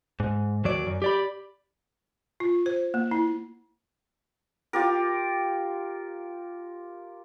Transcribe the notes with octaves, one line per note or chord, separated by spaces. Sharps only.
G#2
D#2 F#3 D5
F#2
G4 D5 B5
F4
C5
A#3
E4
F4 G4 A#4